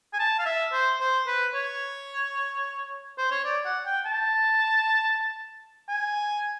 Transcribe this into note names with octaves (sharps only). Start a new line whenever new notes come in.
G#5
A5
F5
E5
C5
C5
B4
C#5
C5
C#5
D5
F#5
G5
A5
G#5